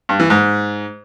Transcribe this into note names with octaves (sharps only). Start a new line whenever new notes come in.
G2
E3
G#2